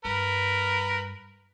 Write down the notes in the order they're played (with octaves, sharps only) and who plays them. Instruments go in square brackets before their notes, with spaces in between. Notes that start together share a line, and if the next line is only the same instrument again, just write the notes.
[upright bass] G2 [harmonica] A#4 B4